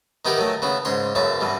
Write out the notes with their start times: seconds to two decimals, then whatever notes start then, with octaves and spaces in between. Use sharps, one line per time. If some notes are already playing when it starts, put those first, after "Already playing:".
0.25 D#3 B3 D#4 E4 G4 A#4
0.37 D#3 F#3 A3
0.62 C#3 B3 E4
0.85 G#2 C#3 C#5 C6
1.15 B1 F#2 C#3 E5 A5
1.41 G2 B2 E3